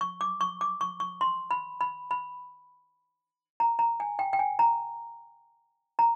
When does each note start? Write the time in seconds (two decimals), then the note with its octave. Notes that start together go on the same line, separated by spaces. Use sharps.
0.01 C#6
0.21 D6
0.41 C#6
0.61 D6
0.81 C#6
1.00 C#6
1.21 C6
1.51 B5
1.81 B5
2.11 B5
3.60 A#5
3.79 A#5
4.00 G#5
4.19 G5
4.33 G5
4.39 G#5
4.59 A#5
5.99 A#5